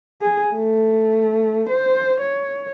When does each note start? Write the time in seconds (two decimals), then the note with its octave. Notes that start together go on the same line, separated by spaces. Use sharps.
0.22 G#4
0.54 A3
1.69 C5
2.20 C#5